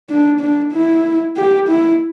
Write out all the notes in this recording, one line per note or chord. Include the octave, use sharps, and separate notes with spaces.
D4
D4
E4
G4
E4